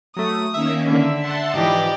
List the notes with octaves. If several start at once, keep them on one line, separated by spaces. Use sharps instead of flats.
F#3 A3 D#6
D#3 A#3 C#4 E5
D3
F#5 A5 C6
G#2 E3 F3 D#4 G4 D5